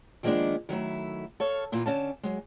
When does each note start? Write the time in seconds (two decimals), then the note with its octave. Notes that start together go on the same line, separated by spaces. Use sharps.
0.23 D#3 F3 G#3 A#3 B3 D4
0.69 D#3 F#3 A3 E4
1.40 A4 C#5 F5
1.72 E2 A#2 E3 F4
1.86 D3 C#4 A5
2.23 F#3 G#3